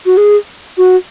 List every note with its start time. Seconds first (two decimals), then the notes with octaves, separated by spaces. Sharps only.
0.06 F#4
0.17 G#4
0.78 F#4